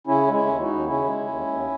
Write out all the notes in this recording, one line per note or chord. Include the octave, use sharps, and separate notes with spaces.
C#3 C#4 E4
G#3
C#4 E4
D#2
D#4 F#4
D#2
C#3 C#4 E4
G#3
D#2
D#2